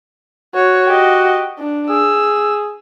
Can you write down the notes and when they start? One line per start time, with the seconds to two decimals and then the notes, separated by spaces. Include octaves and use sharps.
0.55 F#4 C#5
0.88 G4 D#5
1.59 D4
1.90 G#4 E6